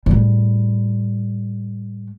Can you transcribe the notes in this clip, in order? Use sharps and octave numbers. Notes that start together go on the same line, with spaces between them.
A2 G3